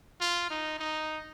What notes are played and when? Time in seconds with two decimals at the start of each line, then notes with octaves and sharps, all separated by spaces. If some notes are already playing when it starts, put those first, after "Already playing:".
0.21 F4
0.50 D#4
0.79 D#4